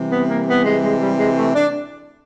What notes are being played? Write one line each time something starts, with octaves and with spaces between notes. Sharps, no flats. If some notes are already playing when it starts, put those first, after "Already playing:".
Already playing: C3 E3 G3
B3
A#3
B3
G#3
G#3
G3
G#3
A3
D4